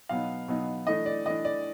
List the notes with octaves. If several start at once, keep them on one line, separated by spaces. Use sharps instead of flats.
B2 F#3 B3 D#4 F5
B2 F#3 B3 D#4
E3 A3 D4 D#5
D5
E3 A3 D4 D#5
D5